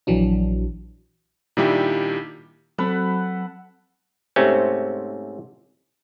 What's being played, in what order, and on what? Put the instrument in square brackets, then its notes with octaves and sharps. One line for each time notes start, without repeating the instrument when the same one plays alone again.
[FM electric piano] A#1 E3 F#3 D4
[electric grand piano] A#2 D#3 G3 D4 E4 G4
[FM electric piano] F#3 C4 [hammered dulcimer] A4 B4 F#5
[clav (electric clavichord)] G#2 C3 A3 C4 C#4